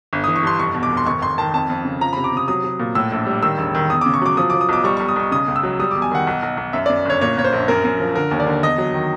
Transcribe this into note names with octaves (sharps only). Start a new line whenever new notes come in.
G1
E3 D#6
C#6
G2 C6
F1 C#6
B2
D6
F1
C6
G#1 C#6
G#1 C6
D#3 A5
F2 A5
F2
C#3
F3 A#5
C3 B5
D6
C3 D#6
F#3 D#6
F#3
A#2
A2 E6
A#1
G3
D#3 E6
E1
D#3
E2 D#6
C#3 D6
C#6
F#3 D6
F3 D#6
F3 D6
D#6
B1 D6
G3 C#6
B1 C#6
D#6
B1 C#6
C#3 D#6
C#2
E6
F#3
G3 D#6
E2 D6
G#5
D#3 F#5
B1
B1
B1
F#2 E5
F#2 D5
G1 C#5
A#2 C#5
A#2 C#5
C5
A#1
F#2 A#4
F#2
F3
D3 A#4
D#2
D5
D3
E2 D#5
F#3
D#3